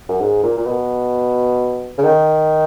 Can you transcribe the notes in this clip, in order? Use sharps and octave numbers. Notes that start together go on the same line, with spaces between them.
F#2
G#2
A#2
A#2
B2
C#3
D#3